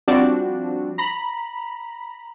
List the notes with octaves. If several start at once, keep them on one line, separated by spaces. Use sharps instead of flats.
F3 G3 C4 D4 F#4
A#5 B5